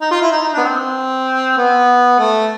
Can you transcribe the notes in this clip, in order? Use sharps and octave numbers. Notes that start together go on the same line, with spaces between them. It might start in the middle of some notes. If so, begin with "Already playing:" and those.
D#4
F4
E4
D#4
D#4
B3 D4
C4
B3
A3